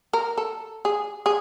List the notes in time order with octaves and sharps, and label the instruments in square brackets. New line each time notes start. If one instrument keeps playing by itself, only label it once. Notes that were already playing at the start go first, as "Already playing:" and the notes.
[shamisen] A#4
A4
G#4
G#4